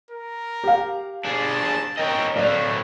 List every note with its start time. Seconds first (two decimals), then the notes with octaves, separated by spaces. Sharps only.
0.10 A#4
0.64 G4 F5
1.25 D4 G#4 A5
1.97 C#4 A#4 D#5 G5
2.36 A2 F#3 D5 F5